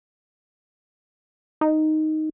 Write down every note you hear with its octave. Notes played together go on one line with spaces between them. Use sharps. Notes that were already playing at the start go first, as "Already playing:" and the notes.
D#4